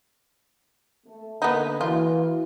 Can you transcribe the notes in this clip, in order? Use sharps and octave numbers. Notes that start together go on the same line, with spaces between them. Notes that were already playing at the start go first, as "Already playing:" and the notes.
A3
D3 A#3 B3 D#4
E3 F4 F#4